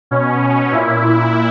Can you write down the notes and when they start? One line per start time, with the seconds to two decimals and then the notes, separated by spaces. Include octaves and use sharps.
0.11 B2 C#4
0.72 A#2 E4